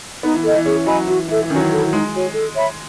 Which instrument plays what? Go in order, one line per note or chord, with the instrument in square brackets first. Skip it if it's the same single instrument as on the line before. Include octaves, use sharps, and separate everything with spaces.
[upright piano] B3 [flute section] D#4
[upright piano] E3
[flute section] A4 D#5
[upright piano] E3
[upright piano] C#4 [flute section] G#4
[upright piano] F#3 [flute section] D#5 G#5 B5
[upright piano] E3 [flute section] F#4
[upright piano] E3 [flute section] A4 E5
[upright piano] E3
[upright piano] D#3 [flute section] C#4
[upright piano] F#3
E3
[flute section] E4 A4
[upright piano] G#3 [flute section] D#4
[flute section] F#4 C#5 G#5
A4
C#5 E5 B5